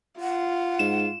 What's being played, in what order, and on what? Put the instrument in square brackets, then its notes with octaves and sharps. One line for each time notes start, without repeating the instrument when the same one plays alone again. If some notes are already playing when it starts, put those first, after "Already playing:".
[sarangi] F4 [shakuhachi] F#5
[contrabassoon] G#2 [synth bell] E7